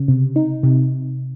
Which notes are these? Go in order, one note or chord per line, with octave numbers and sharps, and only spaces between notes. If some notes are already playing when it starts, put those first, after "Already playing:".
Already playing: C#3
C3
D#4
C3